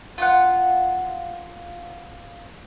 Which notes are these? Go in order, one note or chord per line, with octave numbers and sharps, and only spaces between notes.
F4 F#5